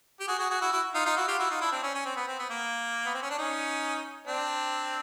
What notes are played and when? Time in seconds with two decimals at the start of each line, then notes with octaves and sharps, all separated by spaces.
0.20 G4
0.28 F#4 G#4
0.39 F#4 G#4
0.50 F#4 G#4
0.61 E4 F#4
0.72 E4 F#4
0.94 D#4 F4
1.06 D#4 F4
1.17 E4 F#4
1.28 F4 G4
1.39 E4 F#4
1.50 D#4 F4
1.61 D4 E4
1.72 C4 D4
1.83 C#4
1.95 C#4
2.06 C4
2.16 B3
2.28 C4
2.39 B3
2.50 A#3
3.06 B3
3.14 C4
3.22 C#4
3.30 D4
3.38 C#4 D#4
4.27 C4 D4